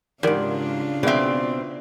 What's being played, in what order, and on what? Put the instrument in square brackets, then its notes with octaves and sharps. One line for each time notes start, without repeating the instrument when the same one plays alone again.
[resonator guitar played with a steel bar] E2 G#2 [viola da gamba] C#3 D4 F4 [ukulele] G4 A#4 D5
[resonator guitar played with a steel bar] B2 C4 [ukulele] G#4 B4 E5 [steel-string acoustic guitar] D5